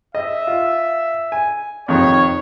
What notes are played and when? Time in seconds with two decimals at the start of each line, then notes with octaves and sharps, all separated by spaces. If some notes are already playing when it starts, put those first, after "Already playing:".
0.15 D#5 E5
0.47 F4
1.32 G#5
1.88 F2 C3 D#3 C#5